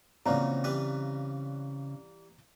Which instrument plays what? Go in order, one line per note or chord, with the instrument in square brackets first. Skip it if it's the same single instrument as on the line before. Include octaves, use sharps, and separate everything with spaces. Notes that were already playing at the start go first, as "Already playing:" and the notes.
[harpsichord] A#1 E3 F#3 [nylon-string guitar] C#3 C4 [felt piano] D5 F5 A#5
[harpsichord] E3 G3 B4